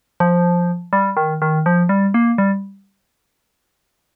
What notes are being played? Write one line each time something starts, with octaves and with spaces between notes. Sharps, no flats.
F3
G3
D#3
D#3
F3
G3
A#3
G3